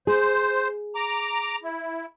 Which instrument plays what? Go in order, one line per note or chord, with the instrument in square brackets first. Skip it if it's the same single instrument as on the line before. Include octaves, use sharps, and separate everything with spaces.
[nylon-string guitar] G#4 [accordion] C5
[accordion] A#5 D6
E4